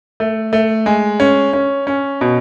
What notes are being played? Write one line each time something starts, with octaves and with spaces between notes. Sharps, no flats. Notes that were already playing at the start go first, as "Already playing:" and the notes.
A3
A3
G#3
C#4
C#4
C#4
B2